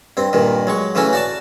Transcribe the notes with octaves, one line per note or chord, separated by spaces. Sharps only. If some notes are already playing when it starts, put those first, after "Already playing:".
G2 C4
G2 A#2 D#3
F#3 G#3 C#6
C#3 E3 A3 C#4 F#4
F#4 D5 A5